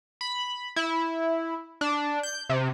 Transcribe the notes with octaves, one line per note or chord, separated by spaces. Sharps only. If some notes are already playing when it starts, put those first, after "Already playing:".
B5
E4
D4
G6
C3